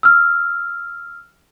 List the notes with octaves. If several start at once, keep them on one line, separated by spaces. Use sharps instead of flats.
E6 F6